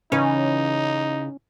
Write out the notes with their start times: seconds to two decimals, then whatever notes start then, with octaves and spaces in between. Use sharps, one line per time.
0.12 C#3 E3 C#4 D#4 B4